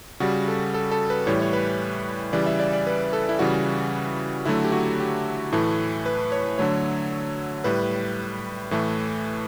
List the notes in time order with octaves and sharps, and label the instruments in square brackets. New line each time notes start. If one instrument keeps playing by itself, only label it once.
[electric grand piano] C#3 G3 F#4
A4
A4
A4
B4
A2 E3 G3 C#5
C#5
B4
C#3 E3 G3 D5
E5
D5
D5
B4
A4
E4
C#3 E3 G3 F#4
D3 F#3 A3 E4
G4
F#4
G4
A2 E3 A3
B4
C#5
D3 F#3 A3 C#5
A2 G3 B4
A2 E3 A3